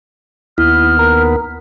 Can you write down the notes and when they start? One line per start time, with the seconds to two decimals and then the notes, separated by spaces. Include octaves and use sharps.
0.58 D#2 B3 E4 F6
0.99 A#4 A#5